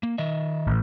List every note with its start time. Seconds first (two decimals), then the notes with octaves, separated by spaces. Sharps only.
0.03 A#3
0.18 D#3 D#5 E5
0.67 A1